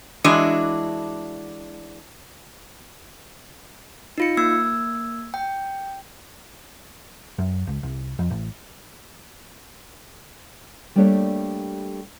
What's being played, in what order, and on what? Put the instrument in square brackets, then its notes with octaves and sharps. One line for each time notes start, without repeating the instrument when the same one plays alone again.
[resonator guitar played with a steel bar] E3 G#3 D4 E4 F#4 D#5
[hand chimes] D#4 F4 C#7
A#3 E6 G#6
G5
[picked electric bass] F#2
C#2
C2
F2
A1
[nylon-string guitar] G3 A3 A#3 D4 G4 C#5